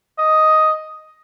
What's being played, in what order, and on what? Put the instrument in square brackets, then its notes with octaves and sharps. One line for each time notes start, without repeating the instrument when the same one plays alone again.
[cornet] D#5